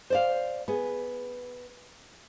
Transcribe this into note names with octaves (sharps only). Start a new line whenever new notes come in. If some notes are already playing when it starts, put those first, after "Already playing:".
C5 D5 F5
B3 G#4